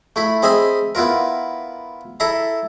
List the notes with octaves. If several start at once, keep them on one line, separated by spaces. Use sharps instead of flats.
A3 E4 B5
C4 G#4 D#5 E5 G#5 B5
B3 E4 F4 A#4
E4 A4 E5 A#5